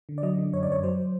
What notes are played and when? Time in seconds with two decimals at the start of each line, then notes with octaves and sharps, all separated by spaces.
0.09 D3
0.18 D5
0.23 F#3 D#5
0.38 D3
0.53 F#2 C#5
0.63 D5
0.68 F#2 C#5
0.83 F#3 C5